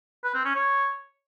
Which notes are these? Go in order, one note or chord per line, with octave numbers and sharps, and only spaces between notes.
B4
C4
C#4
C#5